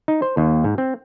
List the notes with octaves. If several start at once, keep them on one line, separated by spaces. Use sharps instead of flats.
D#4
C5
D#2
G#2
C4